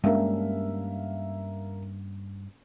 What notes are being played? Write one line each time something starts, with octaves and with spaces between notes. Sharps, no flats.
G2 G#3 A#3 C#4 D4 A#4 E5 F5